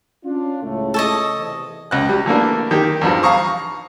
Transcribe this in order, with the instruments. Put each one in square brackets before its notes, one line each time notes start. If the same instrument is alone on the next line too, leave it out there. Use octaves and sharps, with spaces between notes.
[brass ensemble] C#4 D4 F4
C#2 A2 A3
[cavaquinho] A4 C#5 D#5
[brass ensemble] E2 C3
[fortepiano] C#2 F#6
G3
E3 A3 A#3 D4
D#3 G4
E2 G2 F3
F5 A#5 C#6 D#6